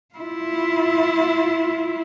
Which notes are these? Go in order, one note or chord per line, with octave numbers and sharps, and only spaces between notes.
E4 F4